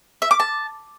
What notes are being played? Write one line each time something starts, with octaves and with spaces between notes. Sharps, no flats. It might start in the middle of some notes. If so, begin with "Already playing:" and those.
E5
D6
A5